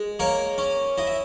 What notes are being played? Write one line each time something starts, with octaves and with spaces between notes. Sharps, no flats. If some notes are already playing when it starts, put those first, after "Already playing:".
Already playing: G#3
A#3 A#4 C#5
C#4
E4 D#5
E5